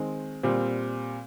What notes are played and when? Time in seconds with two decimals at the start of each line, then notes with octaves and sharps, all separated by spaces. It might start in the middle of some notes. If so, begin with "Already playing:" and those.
Already playing: D#3 G#3 C4
0.43 A#2 G3 C4